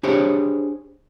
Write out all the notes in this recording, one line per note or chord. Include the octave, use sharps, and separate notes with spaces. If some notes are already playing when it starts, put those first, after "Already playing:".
D4 G4 G#4 C5 C#5